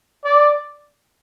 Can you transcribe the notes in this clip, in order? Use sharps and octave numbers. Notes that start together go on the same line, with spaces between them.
D5